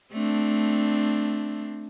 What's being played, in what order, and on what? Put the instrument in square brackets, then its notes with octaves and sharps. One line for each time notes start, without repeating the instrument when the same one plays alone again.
[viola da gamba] A3 C4 D4